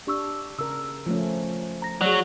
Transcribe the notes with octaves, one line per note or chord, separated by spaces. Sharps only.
D4 G4 C#6 E6
C#3 A#4 E6
F3 A3 C#4
A#5 A#6
F#3 G#4 D5